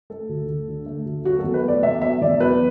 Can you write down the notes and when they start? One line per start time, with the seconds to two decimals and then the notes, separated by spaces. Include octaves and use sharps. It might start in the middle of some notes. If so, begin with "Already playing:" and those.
0.10 A3 A4
0.29 D2
0.48 D2
0.68 D3
0.86 A3
1.05 D2
1.24 F#3 F#4
1.39 E2 A4
1.54 B4
1.64 A3 D5
1.83 B2 E5
2.02 F#3 E5
2.21 E2 D5
2.40 F#3 B4